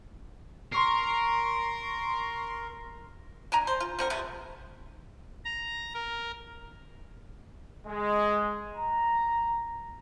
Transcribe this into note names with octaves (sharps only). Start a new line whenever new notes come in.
A#4 C6 C#6 C7
D4 G#5 A#5
C5
F4
D3 C4 A#4
C3 G#3 A3 B3
A#5
A#4
G#3
A#5